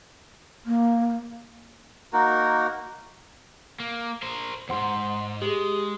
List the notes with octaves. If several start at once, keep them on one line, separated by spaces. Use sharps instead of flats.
A#3
A#3 D#4 F#4 A#4
A#3
A#4 C5
E2 G#2 C5 F#5 C6
G#3 G4 G#4